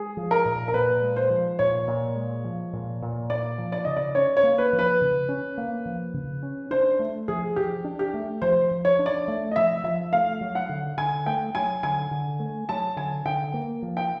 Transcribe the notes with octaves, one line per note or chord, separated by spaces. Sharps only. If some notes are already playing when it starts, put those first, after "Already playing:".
Already playing: G#3 G#4
F3
A#4
A#2
A#4
A#2 B4
G#3
C5
F3
A#2 C#5
A#2
G#3
F3
A#2
A#2
A#3 D5
F3
D5
C#3 D#5
D5
C#4 C#5
C#5
A#3
B4
F3
B4
C#3
C#4
A#3
F3
C#3
C#4
D4 C5
A3
F3 G#4
F3 G4
D4
G4
A3
F3 C5
F3
C#5
D4
D5
A3
D#5
F3 E5
F3 E5
A3 F5
F#3
F#5
D3
D3 G#5
A3 G5
F#3 G#5
D3 G#5
D3
A3
F#3 A5
D3 G#5
D3 G5
A#3
F3
G5